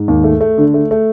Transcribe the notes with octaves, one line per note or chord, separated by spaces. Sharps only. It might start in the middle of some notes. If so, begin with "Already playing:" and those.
Already playing: G#2
D#2
A3
A3
D3
A3
A3